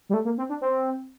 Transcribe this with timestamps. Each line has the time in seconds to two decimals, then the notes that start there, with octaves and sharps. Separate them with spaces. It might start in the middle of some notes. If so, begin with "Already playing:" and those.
0.09 G3
0.14 A3
0.25 A#3
0.38 C4
0.49 D4
0.61 C4